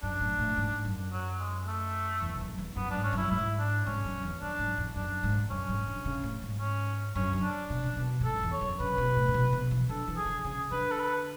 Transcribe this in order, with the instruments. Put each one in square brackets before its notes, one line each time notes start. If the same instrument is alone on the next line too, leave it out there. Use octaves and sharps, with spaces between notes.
[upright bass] F#2 [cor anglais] D4
[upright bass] A2
A2
G#2
F#2
[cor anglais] F#3
G#3
A3
[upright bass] E2
G#2
F#2
E2
[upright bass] F#2 [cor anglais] B3
[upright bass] G#2 [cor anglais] D4
[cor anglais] C#4
[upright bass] F#2 [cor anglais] E4
[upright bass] G#2 [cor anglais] E4
[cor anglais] D4
[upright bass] G#2 [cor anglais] C#4
[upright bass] F#2
E2
[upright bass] F#2 [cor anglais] D4
[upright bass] G#2
E2
[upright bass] F#2 [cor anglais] D4
[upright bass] G#2
[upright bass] F#2 [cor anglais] C#4
[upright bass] G#2
D3
C#3
A2
G#2
[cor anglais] C#4
[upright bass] F#2 [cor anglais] C#4
[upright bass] D3
[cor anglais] D4
[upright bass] B2
C#3
B2
A2
[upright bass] G#2 [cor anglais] A4
[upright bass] F#2
E2
[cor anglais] C#5
[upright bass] F#2
[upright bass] C#3 [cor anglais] B4
[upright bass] B2
A2
C#3
B2
B2
E3
[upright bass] D3 [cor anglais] A4
[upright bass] E3
[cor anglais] G#4
[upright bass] D3
[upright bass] C#3 [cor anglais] G#4
[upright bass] D3 [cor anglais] B4
[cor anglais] A4
B4